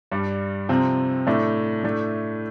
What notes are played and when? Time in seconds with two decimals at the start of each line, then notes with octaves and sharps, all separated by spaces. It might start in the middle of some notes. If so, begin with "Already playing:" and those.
0.11 G2 G3 D4
0.69 C3 F3 C4
1.27 A2 A3 D4
1.84 A2 A3 D4